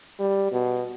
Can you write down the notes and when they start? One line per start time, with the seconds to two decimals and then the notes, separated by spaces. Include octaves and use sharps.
0.19 G3
0.51 B2